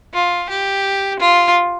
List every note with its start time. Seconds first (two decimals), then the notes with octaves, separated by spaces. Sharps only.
0.14 F4
0.49 G4
1.19 F4